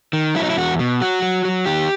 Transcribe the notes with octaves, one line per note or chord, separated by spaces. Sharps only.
D#3
F#3 E4
D#4
E4
E2 F#4
B2
F#3 F#4
F#3
F#3
D#3 G4